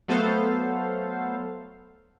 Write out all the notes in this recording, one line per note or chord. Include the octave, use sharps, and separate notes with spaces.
F#3 A3 B3 A4 C5 F5